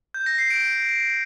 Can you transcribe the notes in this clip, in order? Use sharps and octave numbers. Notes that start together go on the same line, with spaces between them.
G6
A#6
C7
D7